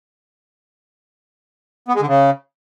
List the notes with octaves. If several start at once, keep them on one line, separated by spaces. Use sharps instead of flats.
B3
G#3
D3
C#3